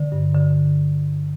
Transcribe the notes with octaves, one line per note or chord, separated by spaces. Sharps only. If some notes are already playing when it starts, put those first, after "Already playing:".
Already playing: D3
G2
D3